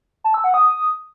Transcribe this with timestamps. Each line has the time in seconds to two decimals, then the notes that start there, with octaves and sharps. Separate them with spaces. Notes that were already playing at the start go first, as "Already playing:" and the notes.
0.24 A5
0.34 E6
0.44 F#5
0.54 D#6